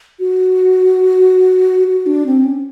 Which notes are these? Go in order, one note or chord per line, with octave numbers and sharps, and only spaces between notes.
F#4
F#4
D4
C4
C#4